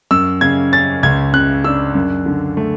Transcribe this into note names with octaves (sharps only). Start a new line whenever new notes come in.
F#2 E6
C#3 G#6
C#4 A6
C#2 G#6
C#3 F#6
D4 E6
F#2
D3
A3